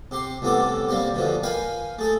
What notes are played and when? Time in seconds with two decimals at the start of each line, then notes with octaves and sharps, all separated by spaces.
0.11 C3 G4 C6
0.42 C2 A2 E3 B3 A4 D6
0.89 C3 G3 A#3 C4 G4
1.15 B2 D3 E3 F3
1.43 A#4 B4 F5 G5 G#5 B5
1.99 A3 G#4 A4